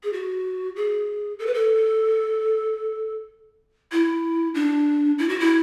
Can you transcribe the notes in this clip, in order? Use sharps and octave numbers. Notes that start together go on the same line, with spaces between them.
G#4
F#4
G#4
A4
B4
A4
E4
D4
E4
F#4
E4